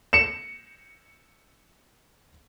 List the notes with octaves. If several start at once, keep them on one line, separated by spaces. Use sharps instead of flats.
C#7 E7